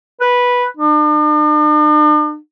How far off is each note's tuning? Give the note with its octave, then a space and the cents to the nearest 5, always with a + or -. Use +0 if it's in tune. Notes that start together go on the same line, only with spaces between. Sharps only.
B4 -10
D4 +45